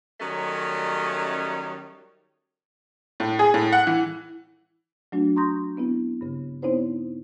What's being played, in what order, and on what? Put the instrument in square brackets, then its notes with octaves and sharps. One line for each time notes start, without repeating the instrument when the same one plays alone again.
[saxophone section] D#3 F#3 G3 A3 C#4 D#5
[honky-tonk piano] A2
G#4
A2
F#5
E3
[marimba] F#3 A3 D4 F#4
A#5 C6 C#6 D#6 G6 A#6
B3 C4 E4
G2 C#3
B3 C4 D#4 E4 C5 C#5